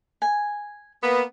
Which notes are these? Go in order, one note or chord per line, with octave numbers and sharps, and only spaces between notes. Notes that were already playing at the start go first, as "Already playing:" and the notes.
G#5
A#3 B3